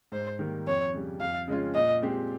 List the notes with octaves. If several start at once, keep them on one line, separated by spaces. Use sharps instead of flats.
G#2 C5
D#3 G3 A#3
F2 C#5
C#3 G3
F2 F5
C#3 G#3 C#4 F4
A#2 D#5
G#3 C4 G4